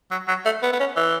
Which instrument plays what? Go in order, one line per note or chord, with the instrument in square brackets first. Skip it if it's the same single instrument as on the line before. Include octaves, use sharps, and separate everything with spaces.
[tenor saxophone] F#3
F#3
A3
B3
B3
C#4
E3